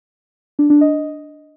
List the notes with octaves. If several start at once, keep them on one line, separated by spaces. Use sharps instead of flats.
D4
D4
D#5